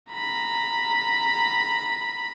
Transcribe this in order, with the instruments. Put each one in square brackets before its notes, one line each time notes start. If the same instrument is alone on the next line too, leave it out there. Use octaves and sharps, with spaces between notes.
[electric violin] A#5 B5